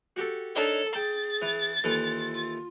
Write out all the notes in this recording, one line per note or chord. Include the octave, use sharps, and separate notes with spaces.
F#4 G4 A4
D4 D#4 A4 A#4 C#5
G#4 G5 A6
E3
D#2 E3 F4 A4
F4